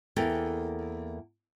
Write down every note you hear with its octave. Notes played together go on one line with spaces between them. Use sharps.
E2 A#3 A4 G5